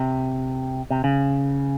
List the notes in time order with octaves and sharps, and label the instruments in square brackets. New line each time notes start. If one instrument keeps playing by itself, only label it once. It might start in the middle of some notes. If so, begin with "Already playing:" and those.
Already playing: [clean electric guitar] C3
C3
C#3